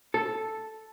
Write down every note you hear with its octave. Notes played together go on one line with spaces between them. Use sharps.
A4